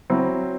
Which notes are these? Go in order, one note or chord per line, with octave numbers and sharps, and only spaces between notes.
F#3 C4 E4